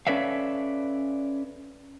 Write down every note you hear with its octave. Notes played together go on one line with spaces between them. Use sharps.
C#4 A4 B4 D5 E5 F5